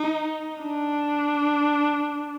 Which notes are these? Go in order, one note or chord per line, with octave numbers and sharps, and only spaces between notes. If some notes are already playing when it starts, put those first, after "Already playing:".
Already playing: D#4
D4